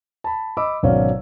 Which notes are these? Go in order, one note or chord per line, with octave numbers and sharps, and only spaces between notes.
A5 B5
D#5 B5 D6 E6
G#1 B2 F#3 C#4 D5 F5